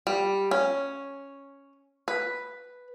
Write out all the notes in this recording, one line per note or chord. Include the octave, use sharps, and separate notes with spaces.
G3
C#4
B4